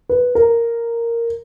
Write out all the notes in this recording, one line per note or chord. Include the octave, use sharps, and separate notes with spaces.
B4
A#4